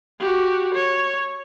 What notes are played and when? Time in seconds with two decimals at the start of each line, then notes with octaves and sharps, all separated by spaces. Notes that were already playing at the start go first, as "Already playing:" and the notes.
0.20 F#4 G4
0.74 C#5